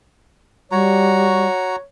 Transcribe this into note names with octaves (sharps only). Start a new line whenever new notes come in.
G3 F#4 C#5 A#5